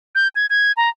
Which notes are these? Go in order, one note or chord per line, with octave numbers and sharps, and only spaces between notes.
G6
G#6
G#6
A#5